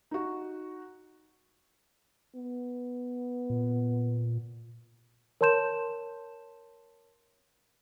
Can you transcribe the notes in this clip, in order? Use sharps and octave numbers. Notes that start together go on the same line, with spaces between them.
D#4 F#4
B3
A#2
A#4 C#5 A5 C6 G6 E7